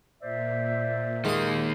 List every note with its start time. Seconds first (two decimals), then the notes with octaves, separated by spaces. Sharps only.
0.22 A#2 C5 D5 E5
1.25 D#3 G#3 A#3 D#6